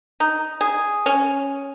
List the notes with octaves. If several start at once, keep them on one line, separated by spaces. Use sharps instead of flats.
D#4
G#4
C#4